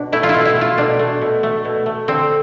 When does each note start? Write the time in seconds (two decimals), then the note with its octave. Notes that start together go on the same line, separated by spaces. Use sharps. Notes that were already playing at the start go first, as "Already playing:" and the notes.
Already playing: B2 D4
0.12 A3 E4
0.23 F4
0.29 E4
0.35 B2
0.45 E4
0.56 A3
0.61 F4
0.78 B2 D4
0.99 A3
1.22 B2
1.43 A3
1.65 B2
1.86 A3
2.08 D3 C4